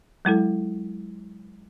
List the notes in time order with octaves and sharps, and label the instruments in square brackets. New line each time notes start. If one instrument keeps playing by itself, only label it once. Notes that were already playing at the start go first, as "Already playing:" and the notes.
[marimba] F#3 G#3 E4 A4